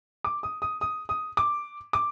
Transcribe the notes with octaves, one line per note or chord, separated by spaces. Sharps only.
D6
D#6
D#6
D#6
D#6
D6
D6